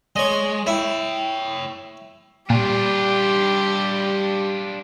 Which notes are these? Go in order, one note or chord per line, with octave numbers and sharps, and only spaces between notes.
G#3 C#5 D#5
E4 C#5 G5
A#2 G3 D4 F4 G4